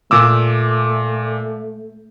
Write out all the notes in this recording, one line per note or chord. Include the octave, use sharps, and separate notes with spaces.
A#2 A3 D6 E6